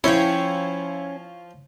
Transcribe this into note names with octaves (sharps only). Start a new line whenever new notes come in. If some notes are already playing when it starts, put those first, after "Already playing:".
F3 C#4 E4 C5 C#5 G5